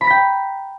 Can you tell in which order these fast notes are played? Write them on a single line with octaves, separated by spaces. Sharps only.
B5 A#5 B6 G5